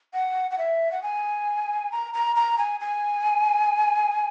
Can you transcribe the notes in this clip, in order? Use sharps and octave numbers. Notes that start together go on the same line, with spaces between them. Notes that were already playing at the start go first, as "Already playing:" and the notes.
F#5
F#5
E5
F#5
G#5
A#5
A#5
A#5
G#5
G#5